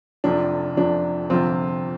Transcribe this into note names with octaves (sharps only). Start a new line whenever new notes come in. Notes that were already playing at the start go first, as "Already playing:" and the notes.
F1 F2 C3 F3 D4
F1 F2 C3 F3 D4
G1 F2 C3 F3 C4 F4